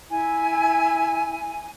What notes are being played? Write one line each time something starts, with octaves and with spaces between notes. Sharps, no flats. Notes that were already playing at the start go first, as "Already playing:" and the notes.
E4 G#5